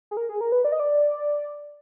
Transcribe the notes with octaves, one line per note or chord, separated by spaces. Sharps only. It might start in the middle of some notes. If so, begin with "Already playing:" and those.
G#4
A#4
G#4
A#4
B4
D5
D#5
D5